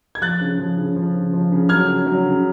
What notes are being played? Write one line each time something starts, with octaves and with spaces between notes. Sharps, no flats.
G#6
F3 F#6 A6
C#3
F3
C#3
F3
C#3
F3
C#3
F#3 F6 G#6
C#3
F#3
C#3